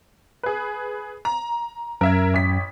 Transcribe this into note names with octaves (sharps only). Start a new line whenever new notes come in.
G#4 B4
A#5
F#2 A#4 E5 G#6
A1 B6